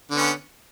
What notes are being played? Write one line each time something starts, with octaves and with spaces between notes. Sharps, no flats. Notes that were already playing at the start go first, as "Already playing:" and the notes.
D3 B3 C#4